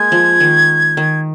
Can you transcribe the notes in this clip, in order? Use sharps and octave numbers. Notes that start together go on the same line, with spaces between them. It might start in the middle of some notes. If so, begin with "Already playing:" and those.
Already playing: G#3 A#3 G#6
F3
D#3
D#3